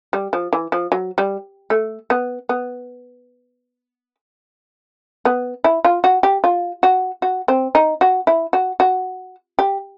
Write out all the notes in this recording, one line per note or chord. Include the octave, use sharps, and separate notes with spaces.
G3
F3
E3
F3
F#3
G3
A3
B3
B3
B3
E4
F4
F#4
G4
F4
F#4
F#4
C4
D#4
F#4
E4
F#4
F#4
G4